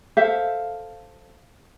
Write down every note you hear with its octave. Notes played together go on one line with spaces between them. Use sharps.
A4 C5 E5 F5